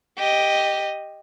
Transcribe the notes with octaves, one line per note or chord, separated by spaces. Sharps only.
G4 D#5